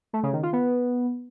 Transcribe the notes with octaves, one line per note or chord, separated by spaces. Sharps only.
A3
C#3
D#3
F4
B3